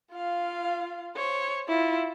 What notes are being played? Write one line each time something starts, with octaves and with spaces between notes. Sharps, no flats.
F4 F5
C5 C#5
E4 F4